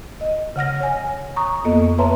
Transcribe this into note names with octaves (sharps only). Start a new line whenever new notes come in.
D#5
C#3 F#5 F6 A#6
C#5 G#5
A#5 C#6 D#6
F2 A#3 B3 A4 D#5
B4 C#5 E5 A5 A#5 C6